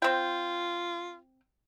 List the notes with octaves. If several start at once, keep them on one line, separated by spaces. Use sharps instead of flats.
C4 F4 G5